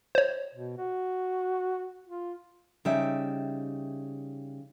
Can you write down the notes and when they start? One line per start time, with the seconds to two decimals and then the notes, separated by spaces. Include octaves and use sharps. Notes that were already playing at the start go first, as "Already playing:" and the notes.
0.15 C5 C#5
0.55 B2
0.78 F#4
2.06 F4
2.85 C#3 G3 D#4 E5 G5